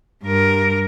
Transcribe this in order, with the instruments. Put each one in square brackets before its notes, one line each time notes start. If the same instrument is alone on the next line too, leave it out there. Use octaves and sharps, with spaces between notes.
[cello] G2 A#4